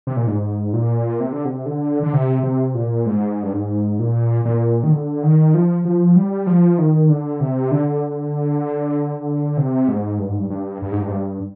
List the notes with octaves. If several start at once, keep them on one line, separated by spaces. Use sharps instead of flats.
C3
A#2
G#2
A#2
C3
D3
C3
D3
D3
C3
C3
A#2
G#2
G2
G#2
A#2
A#2
D#3
D3
D#3
F3
F3
G3
F3
D#3
D3
C3
D3
C3
G#2
G2
G#2
G2
G2
G2
G#2
G2
G#2
G2